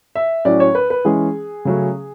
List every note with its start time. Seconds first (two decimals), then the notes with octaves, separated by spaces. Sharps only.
0.15 E5
0.45 A2 F#3 C#4 D5
0.60 C#5
0.75 B4
0.90 B4
1.05 E3 G#3 C#4 G#4
1.65 C#3 F#3 A3 C#4